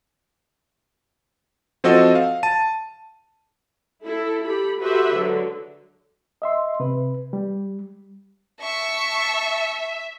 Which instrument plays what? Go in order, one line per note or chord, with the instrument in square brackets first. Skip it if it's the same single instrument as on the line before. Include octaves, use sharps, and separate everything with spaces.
[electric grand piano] F3 C4 F#4 A4 D#5
F5
A5 D#7
[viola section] E4 A4
G4 A4 B5
F#4 G4 A4 B4 C5 E5
D3 F#3 G#3
[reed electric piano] D#5 E5 C6
C3 B4
G3
[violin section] E5 [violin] A5 C#6